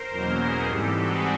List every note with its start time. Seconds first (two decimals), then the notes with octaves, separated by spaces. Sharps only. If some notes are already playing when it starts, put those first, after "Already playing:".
Already playing: A#4 C5
0.10 E2 B2 F#3 A#3 C#4
0.39 G#4 A#4
0.67 G#2 E3 G3 C4 G4 A4
0.96 F#4 G#4